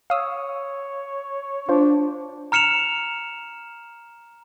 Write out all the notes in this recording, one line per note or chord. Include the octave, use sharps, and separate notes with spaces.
C#5 F5 D#6 E6
D4 F4 C5
A#5 F6 C#7 E7 F7